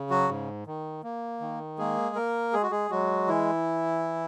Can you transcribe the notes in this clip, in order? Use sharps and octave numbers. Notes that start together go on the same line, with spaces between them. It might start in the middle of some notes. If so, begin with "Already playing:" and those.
Already playing: C#3
F#3 F#4
G#2
D#3
A#3
D#3
G#3 A#3 G#4
A#3 A#4
G#3 G#4
F#4
G#3 G#4
F#3 G#3 F#4
E3 E4